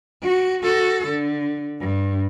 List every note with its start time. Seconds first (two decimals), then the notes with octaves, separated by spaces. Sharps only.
0.23 F#4
0.63 F#4 A4
1.08 D3
1.80 G2